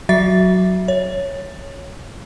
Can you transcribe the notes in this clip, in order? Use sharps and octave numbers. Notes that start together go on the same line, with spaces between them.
F#3 F#4 E5 A6
C#5